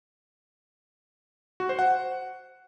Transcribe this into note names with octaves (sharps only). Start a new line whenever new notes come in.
F#4
C5
F#5